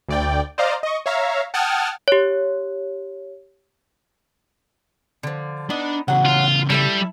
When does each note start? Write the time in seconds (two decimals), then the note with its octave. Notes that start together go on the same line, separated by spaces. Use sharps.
0.09 D2 D5 G5
0.58 C5 D5 D#5 F5 A#5
0.83 D#5 C#6
1.06 C#5 E5 F5 A#5
1.54 F#5 G5 A5 D#6 F6 G#6
2.08 G4 C#5
5.23 D3 F3
5.70 B3 D4 D#4 D5
6.08 C#3 E3 F#3 F#5
6.26 F4
6.70 G3 E4 A4 E5